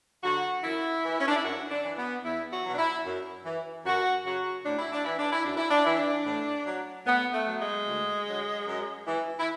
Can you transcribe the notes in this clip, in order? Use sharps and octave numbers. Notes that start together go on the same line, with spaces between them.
D3 F#3 F#4
F#2 E4
E3
C#4
D4
E4
F#2 F#4
D4
E3
B3
E2 E4
F#4
B2 F#3
D4
E4
F#2
E3
F#2 F#4
C#3 F#3 F#4
A2 D4
E4
D4
E3 E4
D4
E4
F#2 D4
E4
D4
E3 E4
D4
A2
F#3
A2 B3
A3
F#3
G#3
D2
D3 F#3
F#2
E3
E4